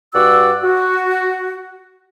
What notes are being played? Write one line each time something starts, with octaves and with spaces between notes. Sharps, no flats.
G2 F#4 D5 F#5 E6
F#4